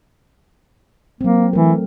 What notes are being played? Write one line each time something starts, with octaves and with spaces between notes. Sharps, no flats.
F#3 A#3 C4
E3 A3 A#4